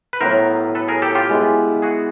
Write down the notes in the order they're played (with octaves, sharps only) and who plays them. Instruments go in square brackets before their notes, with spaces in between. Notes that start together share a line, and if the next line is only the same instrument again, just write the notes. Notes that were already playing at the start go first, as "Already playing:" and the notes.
[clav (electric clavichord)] B4
[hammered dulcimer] A2 F#3 B3 E4 [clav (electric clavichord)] A#4 C5
[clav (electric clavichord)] A4 B4
G#4 A#4
G4 A4
F4 G4
[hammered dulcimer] G#3 B3 E4
[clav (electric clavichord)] F#4 G#4